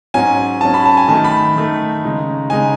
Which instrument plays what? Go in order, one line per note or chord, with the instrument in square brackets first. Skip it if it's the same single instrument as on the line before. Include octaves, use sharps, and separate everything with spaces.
[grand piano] G#2 F#3 C#4 G#5
G#2 F#3 C#4 A5
B5
A5
G#5
D#3 A3 D#4 A5
B5
D#3 A3 D#4
C#3 G#3 D#4
C#3 G#3 D#4 G#5